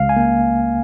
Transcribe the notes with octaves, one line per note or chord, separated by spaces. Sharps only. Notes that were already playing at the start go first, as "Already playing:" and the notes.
Already playing: C#2 F5
G#5
A#3